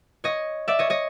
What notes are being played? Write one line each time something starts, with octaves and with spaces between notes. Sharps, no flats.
C#5 D#5
D5 E5
C#5 D#5
C#5 D#5